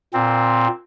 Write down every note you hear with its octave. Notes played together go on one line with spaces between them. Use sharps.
A#2 C4